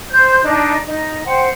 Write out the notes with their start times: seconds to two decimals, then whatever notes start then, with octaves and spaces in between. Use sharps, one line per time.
0.10 C5 G6
0.43 D4 D#4
0.85 D#4
1.25 C5 F#5 G5